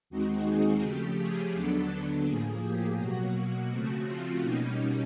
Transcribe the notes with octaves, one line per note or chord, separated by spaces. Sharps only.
D#2 D#3 G#3 C4 D#4 F#4
G#4
C#3 F3 A3 G4
G#4
D#2 D3 F#3 B3 D4 A4
A4
A2 F3 A#3 G#4
G4
B2 F#3 A#3 F#4
C#3 F3 A3 C4
F4
B2 G3 A#3 C#4 D#4